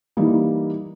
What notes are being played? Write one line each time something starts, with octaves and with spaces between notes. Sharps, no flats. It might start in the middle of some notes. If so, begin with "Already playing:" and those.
E3 G3 A#3 D#4